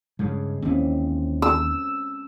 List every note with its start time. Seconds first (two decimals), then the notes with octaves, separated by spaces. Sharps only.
0.19 G2 C#3 G#3
0.62 D#2 E3 C4 C#4
1.42 E6